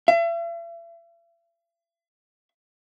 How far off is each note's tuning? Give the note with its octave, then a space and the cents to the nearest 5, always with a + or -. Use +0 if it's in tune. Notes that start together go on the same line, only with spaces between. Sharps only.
E5 +45